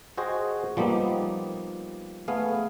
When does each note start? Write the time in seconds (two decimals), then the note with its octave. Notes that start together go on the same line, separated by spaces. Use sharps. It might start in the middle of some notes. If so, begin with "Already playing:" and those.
0.18 F#4 G#4 C5 D#5 G5
0.77 F3 G3 A#3 B3 D#4
2.28 A3 B3 G#4 F5